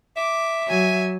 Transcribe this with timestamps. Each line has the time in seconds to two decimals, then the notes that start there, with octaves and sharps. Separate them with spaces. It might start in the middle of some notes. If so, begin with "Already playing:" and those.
0.17 E5 D6
0.69 F#3 G#5